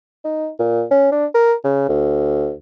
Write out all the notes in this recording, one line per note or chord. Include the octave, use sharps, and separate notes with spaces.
D#4
A#2
C#4
D4
A#4
C#3
D2